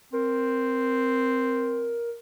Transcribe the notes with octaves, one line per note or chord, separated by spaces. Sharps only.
C4 A#4